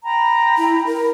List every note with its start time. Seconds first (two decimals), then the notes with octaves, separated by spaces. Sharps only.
0.04 G5 A#5 B5
0.58 E4
0.86 A#4